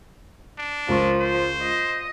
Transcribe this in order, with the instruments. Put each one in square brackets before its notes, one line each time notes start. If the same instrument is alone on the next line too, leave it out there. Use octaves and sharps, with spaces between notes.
[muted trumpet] D4
[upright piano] C#2 A#4 C#6 [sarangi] F3
[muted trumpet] C5
[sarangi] D#5